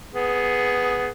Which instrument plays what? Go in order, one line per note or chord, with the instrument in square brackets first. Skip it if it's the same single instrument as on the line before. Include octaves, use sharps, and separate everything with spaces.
[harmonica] B3 G#4